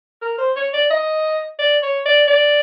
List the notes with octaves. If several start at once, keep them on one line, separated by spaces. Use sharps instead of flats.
A#4
C5
C#5
D5
D#5
D5
C#5
D5
D5